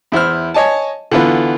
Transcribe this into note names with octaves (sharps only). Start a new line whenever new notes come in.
E2 E4 C5 F6
C#5 D#5 G#5 A5
D3 E3 B3 F4 B4